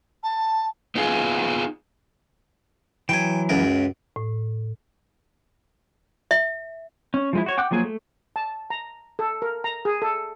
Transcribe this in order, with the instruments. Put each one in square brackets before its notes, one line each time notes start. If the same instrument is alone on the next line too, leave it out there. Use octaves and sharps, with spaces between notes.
[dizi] A5
[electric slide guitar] B3 D#4 F4 G#4
[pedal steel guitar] E3 F#3 [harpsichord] G5 G#5
[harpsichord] C#2 F#2 A#4
[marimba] A2
[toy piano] E5
[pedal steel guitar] C#4
F3 G#3 E4
F#4 C#5
F#5 G5 D6 F#6
F3 F#3 A#3 G#4 G#5
A3
[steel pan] A5
A#5
A4
A#4
A#5
G#4
A4